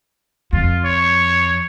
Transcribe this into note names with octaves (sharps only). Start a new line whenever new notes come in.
F2 F4
C#5